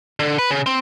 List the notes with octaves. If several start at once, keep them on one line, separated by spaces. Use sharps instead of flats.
D3
B4
C#3
C4